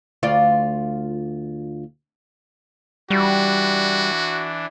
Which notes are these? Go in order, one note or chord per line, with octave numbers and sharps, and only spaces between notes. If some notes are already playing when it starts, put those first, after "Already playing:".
D2 F4 D5
E3 G3 D4 F#4